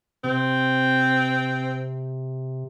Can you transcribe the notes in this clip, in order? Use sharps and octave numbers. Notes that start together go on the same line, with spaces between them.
C3 C4